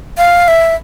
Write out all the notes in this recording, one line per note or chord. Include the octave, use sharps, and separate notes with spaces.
F5
E5